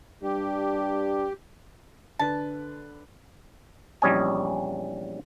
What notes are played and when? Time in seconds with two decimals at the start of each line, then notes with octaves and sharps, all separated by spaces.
0.23 G2 G3 D4 G4
2.19 D3 D4 B4 A5
4.02 A#1 E2 G3 C#4 D#5 G#5